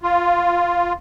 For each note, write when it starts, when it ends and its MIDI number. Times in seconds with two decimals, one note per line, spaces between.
0.03 0.93 65